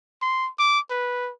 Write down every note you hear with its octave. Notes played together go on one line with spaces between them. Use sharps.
C6
D6
B4